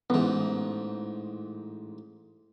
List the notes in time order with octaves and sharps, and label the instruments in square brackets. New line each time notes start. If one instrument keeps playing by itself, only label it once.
[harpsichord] A1 G#2 [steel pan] E3 B3